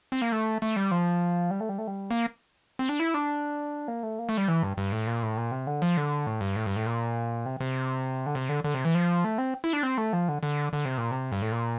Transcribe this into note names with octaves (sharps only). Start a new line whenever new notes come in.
C4
A#3
A3
A3
G3
F3
G3
A3
G3
A3
G3
A#3
C4
D4
E4
D4
A#3
A3
A#3
A3
G3
E3
G2
G2
A2
A#2
A2
A#2
C3
D3
F3
D3
A2
G2
A2
G2
A2
A#2
C3
C3
D3
C3
D3
D3
C3
E3
F3
A3
C4
E4
D4
C4
A3
F3
D3
D3
D3
C3
A#2
C3
G2
A2
A#2